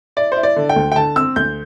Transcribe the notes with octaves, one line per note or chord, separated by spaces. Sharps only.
E4 D5
E4 C5
D5
D3
G5
D2
G5
D3 A5
C4 E6
D2 G6